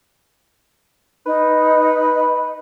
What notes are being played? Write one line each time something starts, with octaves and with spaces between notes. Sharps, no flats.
D#4 B4